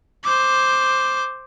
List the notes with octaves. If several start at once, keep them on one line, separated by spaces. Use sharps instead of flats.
C5 D6